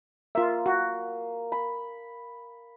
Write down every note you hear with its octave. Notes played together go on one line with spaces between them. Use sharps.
A#3 F4 E5
F#4
B5